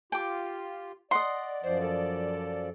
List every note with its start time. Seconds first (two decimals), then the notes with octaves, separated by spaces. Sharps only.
0.12 F4 G4 G5 D6
1.11 D5 D#5 F#5 C6
1.63 F#2 F3 C5 D5
1.81 A4